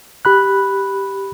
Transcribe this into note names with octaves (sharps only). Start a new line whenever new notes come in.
G4 B5 F#6